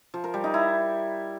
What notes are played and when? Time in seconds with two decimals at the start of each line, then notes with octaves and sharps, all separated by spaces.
0.14 F3
0.24 A#4
0.34 G3
0.44 D#4
0.54 E4